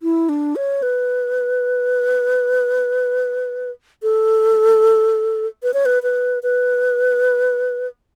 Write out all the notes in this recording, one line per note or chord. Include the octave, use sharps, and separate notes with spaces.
E4
D4
C#5
B4
A4
B4
C#5
B4
B4
B4